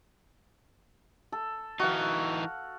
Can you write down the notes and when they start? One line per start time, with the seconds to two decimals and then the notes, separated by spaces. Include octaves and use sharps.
1.32 A4
1.80 E3 D#4 F#4 F5